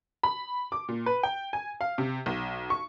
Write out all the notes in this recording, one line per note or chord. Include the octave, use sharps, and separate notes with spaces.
B5
D6
A#2
B4
G5
G#5
F5
C3
B1
C#6